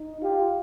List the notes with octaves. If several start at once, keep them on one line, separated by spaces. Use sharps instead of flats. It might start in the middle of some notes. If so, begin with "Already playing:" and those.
Already playing: D#4
F4 G4